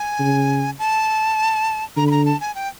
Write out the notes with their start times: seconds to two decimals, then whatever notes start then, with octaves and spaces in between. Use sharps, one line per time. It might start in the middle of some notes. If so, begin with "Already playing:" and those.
Already playing: G#5
0.20 C#3
0.79 A5
1.96 D3 A#5
2.07 B5
2.11 A#5
2.26 A5
2.41 G#5
2.55 G5